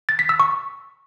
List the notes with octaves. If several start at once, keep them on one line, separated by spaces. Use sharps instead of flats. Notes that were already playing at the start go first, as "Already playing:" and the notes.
A6
B6
E6
C#6